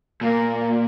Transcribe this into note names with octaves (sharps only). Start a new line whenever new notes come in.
A#2 A#3